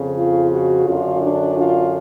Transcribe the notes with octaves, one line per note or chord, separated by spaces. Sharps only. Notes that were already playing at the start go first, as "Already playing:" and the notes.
Already playing: F2 C#3
F4
F#4
F#2 D3 F4
D4
F4